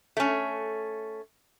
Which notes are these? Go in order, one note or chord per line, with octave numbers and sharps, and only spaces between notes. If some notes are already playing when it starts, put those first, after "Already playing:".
A3 C#4